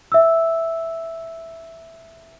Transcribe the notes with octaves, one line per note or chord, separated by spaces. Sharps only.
E5 E6